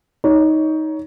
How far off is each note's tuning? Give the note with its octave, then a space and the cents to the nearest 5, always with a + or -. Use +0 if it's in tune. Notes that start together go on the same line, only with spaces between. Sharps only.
D#4 +10 C#5 +20